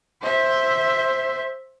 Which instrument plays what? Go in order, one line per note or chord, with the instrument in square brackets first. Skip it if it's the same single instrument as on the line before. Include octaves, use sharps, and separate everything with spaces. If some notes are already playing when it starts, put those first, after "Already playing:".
[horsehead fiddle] C5 E5